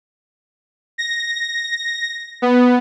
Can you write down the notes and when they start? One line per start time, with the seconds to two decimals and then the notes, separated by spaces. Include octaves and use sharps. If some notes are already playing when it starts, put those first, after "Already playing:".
0.98 A#6
2.42 B3